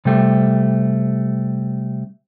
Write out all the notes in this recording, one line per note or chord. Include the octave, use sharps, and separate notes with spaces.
C3 G3 A3